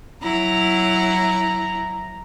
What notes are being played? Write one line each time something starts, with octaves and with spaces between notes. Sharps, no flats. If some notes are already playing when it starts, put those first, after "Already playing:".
F#3 E4 A#5